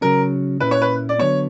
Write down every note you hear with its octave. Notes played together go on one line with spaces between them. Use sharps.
C#3 F#3 C#4 A#4
A#2 A#3 C#4 E4 B4
C#5
B4
D5
D3 F#3 B3 C#5